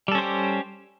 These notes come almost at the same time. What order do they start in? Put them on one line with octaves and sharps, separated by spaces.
G3 A4 C#4 C5 G4